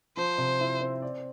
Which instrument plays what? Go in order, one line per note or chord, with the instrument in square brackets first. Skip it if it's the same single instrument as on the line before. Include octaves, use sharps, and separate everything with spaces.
[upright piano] F3 [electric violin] C5
[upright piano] C3
E4
C4
D5